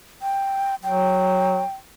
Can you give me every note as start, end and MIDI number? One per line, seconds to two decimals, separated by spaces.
0.22 0.75 79
0.84 1.61 54
0.84 1.72 79